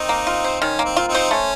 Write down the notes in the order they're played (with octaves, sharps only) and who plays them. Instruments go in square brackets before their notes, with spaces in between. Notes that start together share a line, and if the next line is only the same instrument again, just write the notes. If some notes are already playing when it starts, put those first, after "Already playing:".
Already playing: [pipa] D#3 [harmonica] C4 D#4
[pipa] A#3
F4
C5
[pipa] D#3 [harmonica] C#4
[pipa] A#3
[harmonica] C4
[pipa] F4
[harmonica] C4 D#4
[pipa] C5
[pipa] A3 [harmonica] C#4